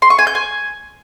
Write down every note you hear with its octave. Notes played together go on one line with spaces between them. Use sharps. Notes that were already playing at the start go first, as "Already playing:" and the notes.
C6
C#6
G#5
G6
G#5